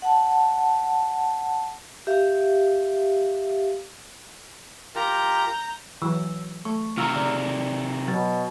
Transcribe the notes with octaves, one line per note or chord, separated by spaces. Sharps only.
F#5 A5
G4 E5 F5
F4 G4 A#4 A#5 G6
E3 F#3 E6
A3 C#6
C3 D#3 F4 A#5 E6 F6
C#3 D5
B2 F#3 A6